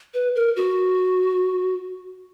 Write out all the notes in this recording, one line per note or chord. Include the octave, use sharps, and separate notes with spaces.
B4
A#4
F#4